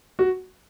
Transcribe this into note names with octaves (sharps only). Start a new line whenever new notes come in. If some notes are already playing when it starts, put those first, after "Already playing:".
F#4